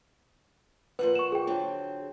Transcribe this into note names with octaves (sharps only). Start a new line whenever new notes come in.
A#2 F3 B4 F#5
C#6 E7
G#4 G5
D3 F#3 C4